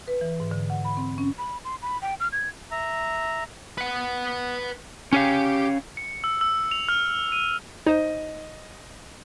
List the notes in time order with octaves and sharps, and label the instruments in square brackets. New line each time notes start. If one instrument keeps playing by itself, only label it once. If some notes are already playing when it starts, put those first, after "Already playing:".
[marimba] B4
E3
G#2
D3
F#5
B5
C4
C#4
[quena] B5
C6
B5
G5
F6
G#6
[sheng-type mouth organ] E5 A#5
[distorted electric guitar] B4 F#5
[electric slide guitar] C#4 C#5 F5 [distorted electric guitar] G4
[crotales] C#7
E6
E6
F7
F6
D#7
[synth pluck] D#4 C5 [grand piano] D#5